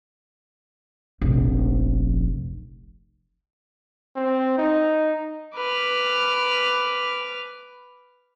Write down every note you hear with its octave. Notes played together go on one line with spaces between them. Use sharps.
F1 A#1
C4
D#4
B4 D6 F6